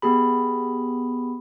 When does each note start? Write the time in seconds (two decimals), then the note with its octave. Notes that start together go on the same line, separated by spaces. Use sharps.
0.02 B3 G4 G#4 B5